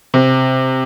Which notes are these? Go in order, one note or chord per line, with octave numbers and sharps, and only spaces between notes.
C3